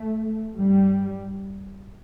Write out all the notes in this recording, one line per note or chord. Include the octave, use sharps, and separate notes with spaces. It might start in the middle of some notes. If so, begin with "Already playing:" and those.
Already playing: A3
G2 G3